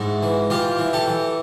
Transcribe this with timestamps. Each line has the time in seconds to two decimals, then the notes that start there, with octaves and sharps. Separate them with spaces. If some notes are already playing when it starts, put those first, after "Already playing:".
Already playing: G#2 E4 F#4
0.23 E3
0.50 E3 F4 G4
0.79 E3
0.93 G4 A4
1.08 E3